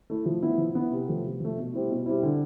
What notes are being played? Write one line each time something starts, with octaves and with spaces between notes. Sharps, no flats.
A3 E4
F3
B3 E4
F3
B3 E4
C3
F3 A3
C3
F3 A3
B2
G3 C4 E4
B2
G3 C4 E4
D3